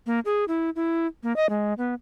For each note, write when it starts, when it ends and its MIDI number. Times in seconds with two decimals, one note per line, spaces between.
0.06 0.20 58
0.25 0.45 68
0.48 0.70 64
0.76 1.07 64
1.23 1.35 58
1.36 1.49 75
1.49 1.74 56
1.78 1.94 59